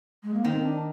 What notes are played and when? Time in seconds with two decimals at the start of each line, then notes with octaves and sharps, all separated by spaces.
0.23 G#3
0.34 A#3
0.44 D#3 C4
0.63 D4